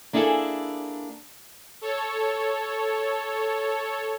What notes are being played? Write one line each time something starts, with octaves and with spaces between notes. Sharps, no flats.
A#3 D4 E4 G#4 A4
A4 C#5